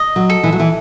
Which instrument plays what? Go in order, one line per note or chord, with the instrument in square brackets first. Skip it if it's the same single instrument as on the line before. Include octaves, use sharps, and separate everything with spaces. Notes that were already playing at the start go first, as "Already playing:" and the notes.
Already playing: [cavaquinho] D#5
[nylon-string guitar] F#3
[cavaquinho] A4
[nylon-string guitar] E3
F#3
E3